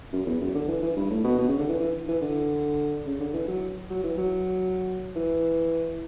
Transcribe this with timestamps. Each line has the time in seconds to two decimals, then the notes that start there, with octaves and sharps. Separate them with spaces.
0.13 F#2
0.26 E2
0.41 F#2
0.55 D3
0.68 E3
0.83 E3
0.97 G2
1.11 A2
1.24 B2
1.38 B2
1.48 C#3
1.59 D3
1.69 E3
1.80 E3
2.09 E3
2.22 D3
3.06 C#3
3.20 D3
3.34 E3
3.48 F#3
3.90 F#3
4.04 E3
4.18 F#3
5.16 E3